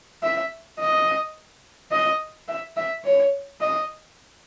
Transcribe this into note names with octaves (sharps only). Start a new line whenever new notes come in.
E5
D#5
D#5
E5
E5
C#5
D#5